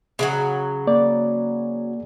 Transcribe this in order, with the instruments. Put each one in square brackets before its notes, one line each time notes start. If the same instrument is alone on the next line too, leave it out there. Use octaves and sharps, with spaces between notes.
[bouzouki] C#3 F3 F#3
[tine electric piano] A#3 [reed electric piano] D5